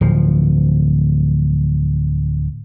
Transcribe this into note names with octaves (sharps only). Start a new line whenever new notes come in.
D1 F3